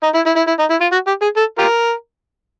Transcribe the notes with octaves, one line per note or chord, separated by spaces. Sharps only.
D#4
E4
E4
E4
E4
D#4
E4
F4
F#4
G4
G#4
A4
F4 G4 A#4